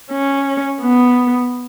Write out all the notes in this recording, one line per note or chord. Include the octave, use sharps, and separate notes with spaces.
C#4
B3